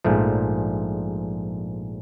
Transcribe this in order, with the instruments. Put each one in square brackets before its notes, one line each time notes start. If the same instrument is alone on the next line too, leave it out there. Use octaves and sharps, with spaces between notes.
[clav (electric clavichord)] A#1 G#2 F3 A3